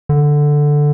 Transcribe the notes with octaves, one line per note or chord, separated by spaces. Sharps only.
D3